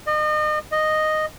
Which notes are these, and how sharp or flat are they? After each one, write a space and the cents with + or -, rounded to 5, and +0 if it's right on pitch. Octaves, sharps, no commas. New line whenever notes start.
D#5 -35
D#5 -5